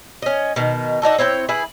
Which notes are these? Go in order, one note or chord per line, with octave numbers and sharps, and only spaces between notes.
C#4 D#5
B2 D#3
D4 D#4 F#4 A4
C4 E4 C#5 G5
E4 G#4 B4